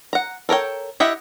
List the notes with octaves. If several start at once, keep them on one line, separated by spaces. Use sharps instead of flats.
F#5 A#5
A4 A#4 C#5 G5
E4 G4 D#5 E5 F#5